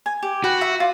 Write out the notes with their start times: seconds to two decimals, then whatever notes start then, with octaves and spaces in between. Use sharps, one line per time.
0.06 G#5
0.23 G4
0.44 F#4 B4 G5
0.61 E5 B5
0.80 F4 D5